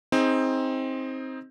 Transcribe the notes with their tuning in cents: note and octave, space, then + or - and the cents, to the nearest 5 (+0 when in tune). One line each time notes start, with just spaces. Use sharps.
C4 +10 D#4 +20 G#4 +0